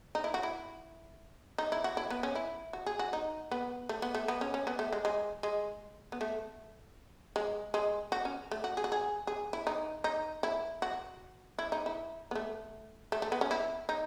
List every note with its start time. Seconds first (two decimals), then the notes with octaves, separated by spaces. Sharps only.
0.15 D#4
0.24 E4
0.34 F#4
0.43 E4
1.58 D#4
1.72 E4
1.84 F#4
1.97 E4
2.10 B3
2.23 C#4
2.35 E4
2.73 F#4
2.86 G#4
2.99 F#4
3.13 D#4
3.51 B3
3.89 A3
4.02 B3
4.15 A3
4.28 B3
4.41 C#4
4.54 C#4
4.67 B3
4.79 A3
4.92 G#3
5.05 G#3
5.43 G#3
6.12 B3
6.21 A3
7.36 G#3
7.74 G#3
8.12 F#4
8.25 C#4
8.51 A3
8.64 F#4
8.77 G#4
8.84 F#4
8.92 G#4
9.27 G#4
9.53 E4
9.67 D#4
10.04 D#4
10.43 E4
10.82 F#4
11.59 E4
11.72 D#4
11.86 E4
12.31 B3
12.35 A3
13.12 A3
13.22 A3
13.32 B3
13.41 C#4
13.51 E4
13.89 D#4